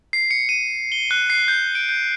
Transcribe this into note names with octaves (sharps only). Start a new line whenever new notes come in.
C7
C#7
D#7
G7
F#6
C7
G6
D7
G6